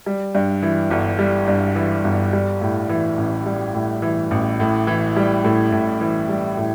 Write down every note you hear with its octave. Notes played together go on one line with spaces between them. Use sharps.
G3
G2
E3
G1
G3
G2
E3
G1
G3
A2
E3
A1
G3
A2
E3
A1
A2
E3
G3
A2
A2
E3
G3
A2